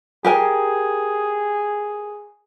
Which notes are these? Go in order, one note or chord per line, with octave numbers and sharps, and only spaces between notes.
G4 G#4 A#4 G#5